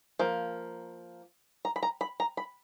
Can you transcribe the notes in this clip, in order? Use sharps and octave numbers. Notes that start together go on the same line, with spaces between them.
F3 A#3
A#5
B5
A#5
B5
A#5
B5